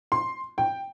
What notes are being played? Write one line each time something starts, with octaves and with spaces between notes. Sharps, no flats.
C6
G5